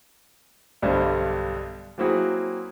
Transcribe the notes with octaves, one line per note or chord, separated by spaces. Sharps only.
B1 G2 D3 G3 C5
F#3 A#3 C4 E4 F#4 G#4